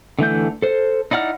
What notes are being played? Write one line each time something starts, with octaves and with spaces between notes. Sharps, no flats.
D3 E3 A3 G6
A4 C5
D#4 E4 D5 F#5 F6